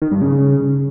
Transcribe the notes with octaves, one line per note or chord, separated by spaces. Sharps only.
D#3
G2
C#3